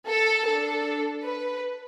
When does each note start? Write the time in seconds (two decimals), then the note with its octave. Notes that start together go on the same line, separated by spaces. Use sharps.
0.08 A4
0.47 D4 A4
1.24 B4